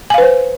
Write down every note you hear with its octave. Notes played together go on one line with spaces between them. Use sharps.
B4 C5 F5 G#5